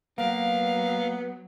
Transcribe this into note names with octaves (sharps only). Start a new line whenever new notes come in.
F#3 A#3 B3 F5